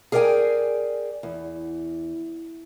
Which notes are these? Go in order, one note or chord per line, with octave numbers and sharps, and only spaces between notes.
G#4 A#4 D5 D#5 G5 G#5
E2